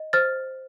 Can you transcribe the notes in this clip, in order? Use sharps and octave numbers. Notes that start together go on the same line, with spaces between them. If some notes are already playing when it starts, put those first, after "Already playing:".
Already playing: D#5
C5 F6 A6